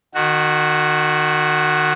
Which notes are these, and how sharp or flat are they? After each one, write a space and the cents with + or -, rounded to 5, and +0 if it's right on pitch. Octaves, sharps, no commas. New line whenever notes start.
D#3 -25 F#4 +0